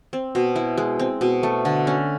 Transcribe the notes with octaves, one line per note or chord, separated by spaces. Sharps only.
C4
B2
E4
G#3
C4
B2
A3
D3
C#4